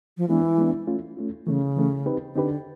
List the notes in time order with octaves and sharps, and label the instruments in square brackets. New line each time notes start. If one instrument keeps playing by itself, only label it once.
[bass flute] F3
[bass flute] E3 [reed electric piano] G#3 B3 D4
[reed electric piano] G#3 B3 D4
A3 C#4 F4
A3 C#4 F4
[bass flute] C#3 [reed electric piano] E3 A3 C#4
[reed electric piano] E3 A3 C#4
C4 D#4 G4 B4
[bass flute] D3 [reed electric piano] C4 D#4 G4 B4